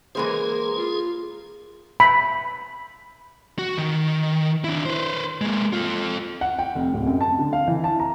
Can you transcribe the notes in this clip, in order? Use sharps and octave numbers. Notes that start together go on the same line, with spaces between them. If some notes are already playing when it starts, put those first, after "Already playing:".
E3 G#3 A#3 G#4 A#4 C5
F4
B5
F#4
D#3
D4 E4
B4 C5
G#3 A#3
F4 A4
F#5
G5
F1
D1
F#2
A5
D3
F5
E3
A5
A#5